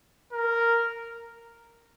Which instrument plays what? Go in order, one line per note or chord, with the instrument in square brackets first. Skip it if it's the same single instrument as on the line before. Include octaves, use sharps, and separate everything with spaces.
[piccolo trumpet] A#4